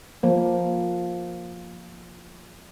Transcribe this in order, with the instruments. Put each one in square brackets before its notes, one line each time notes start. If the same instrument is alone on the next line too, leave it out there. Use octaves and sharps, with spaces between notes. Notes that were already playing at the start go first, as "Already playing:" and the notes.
[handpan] F3 A#3